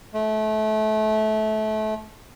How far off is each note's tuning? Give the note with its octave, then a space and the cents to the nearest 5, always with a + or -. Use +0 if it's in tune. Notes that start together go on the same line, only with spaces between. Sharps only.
A3 -25